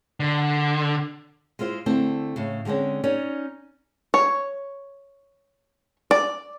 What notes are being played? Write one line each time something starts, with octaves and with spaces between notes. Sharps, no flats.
D3
G#3 E4 F4 C5
D3 A3 C4 E4
A2 C#3
D3 G3 G#3 C4 C#4
C#4 D#4 C#5 D5
C#5
D5